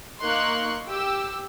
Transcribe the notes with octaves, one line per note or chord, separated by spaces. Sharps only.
A#3 D#4 C6 C#6 F#6
G4 E6